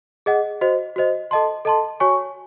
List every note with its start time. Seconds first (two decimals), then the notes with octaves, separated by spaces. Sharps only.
0.26 G#4 D#5 F#5
0.61 F#4 C5 D#5
0.96 F#4 C5 D#5
1.31 A4 D#5 A5 C6
1.65 A4 D#5 A5 C6
2.00 F#4 C#5 G#5 C#6